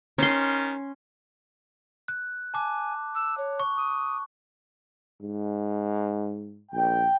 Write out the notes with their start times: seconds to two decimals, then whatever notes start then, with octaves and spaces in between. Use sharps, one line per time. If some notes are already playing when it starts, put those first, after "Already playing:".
0.18 D#3 C#4 C6
2.08 F#6
2.54 G#5 A5 D6
3.15 E6
3.38 C#5
3.60 C#6
3.77 D#6
5.22 G#2
6.72 A#1 G5